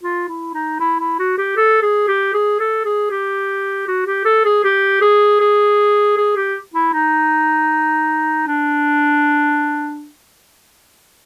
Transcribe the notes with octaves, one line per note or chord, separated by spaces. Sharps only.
F4
E4
D#4
E4
E4
F#4
G4
A4
G#4
G4
G#4
A4
G#4
G4
F#4
G4
A4
G#4
G4
G#4
G#4
G#4
G4
E4
D#4
D4